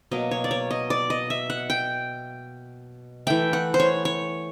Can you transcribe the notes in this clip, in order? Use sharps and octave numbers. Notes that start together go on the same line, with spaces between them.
B2 F#3 A#3 D#5
C#5
D5
C#5
D#5
D5
D#5
E5
F#5
G5
E3 A3 G5
F#5
C5
C#5
C#5